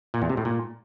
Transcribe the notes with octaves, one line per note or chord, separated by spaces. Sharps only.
A#2
E2
C3
A2
A#2